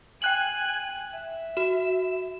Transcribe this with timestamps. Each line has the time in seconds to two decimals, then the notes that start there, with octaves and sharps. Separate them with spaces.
0.22 G5 G#5 F#6 F#7
1.11 E5
1.57 F#4 E7